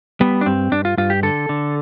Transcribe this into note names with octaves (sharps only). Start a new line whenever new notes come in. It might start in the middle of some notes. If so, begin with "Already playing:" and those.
G3 B3
D4
G2 C4
G2 D4
F4
G2 F4
G4
D3 A4
D3